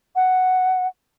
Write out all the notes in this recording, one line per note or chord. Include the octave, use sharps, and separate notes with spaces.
F#5